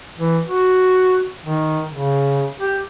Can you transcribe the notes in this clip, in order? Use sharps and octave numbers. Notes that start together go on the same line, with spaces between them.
E3
F#4
D#3
C#3
G4